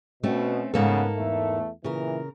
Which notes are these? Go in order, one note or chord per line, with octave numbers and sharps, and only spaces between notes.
B2 A3 C4 C#4
G#2 C#3 A#3 B3 A4
E2 A3
A#2 C#3 E3 A#4